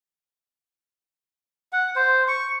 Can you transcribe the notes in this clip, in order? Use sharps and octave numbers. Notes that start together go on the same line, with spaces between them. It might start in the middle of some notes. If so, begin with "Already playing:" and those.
F#5
C5
C#6